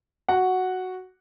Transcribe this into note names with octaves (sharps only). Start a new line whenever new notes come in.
F#4 F#5